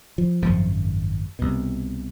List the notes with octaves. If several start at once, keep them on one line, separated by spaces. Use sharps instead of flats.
F3
G#1 F#2 C#3 F3
C2 B2